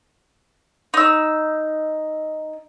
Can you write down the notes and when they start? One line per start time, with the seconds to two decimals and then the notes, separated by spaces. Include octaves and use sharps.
0.94 D#4 E6